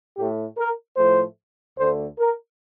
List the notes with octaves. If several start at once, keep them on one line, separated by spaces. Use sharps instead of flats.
A2 A3 G4
A#4
A2 F3 A3 C5
D2 D3 A3 C5
A#4